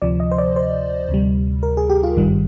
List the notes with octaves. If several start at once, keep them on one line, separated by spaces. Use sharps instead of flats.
D2 C3 F3 D5
D#5
C5
D5
C5
D2 C3 G3
A#4
G#4
G4
F4
G#1 G2 D#3 G3